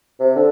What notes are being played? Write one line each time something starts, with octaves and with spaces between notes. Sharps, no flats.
C3
D3